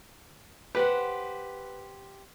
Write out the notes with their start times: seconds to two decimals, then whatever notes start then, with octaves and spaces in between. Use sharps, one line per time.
0.75 G4 B4 C5 F#5